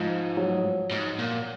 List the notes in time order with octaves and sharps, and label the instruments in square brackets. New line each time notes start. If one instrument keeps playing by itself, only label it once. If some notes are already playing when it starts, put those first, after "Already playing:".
Already playing: [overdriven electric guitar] G#2 [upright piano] F3
[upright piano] F#3
[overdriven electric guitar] G#2
A#2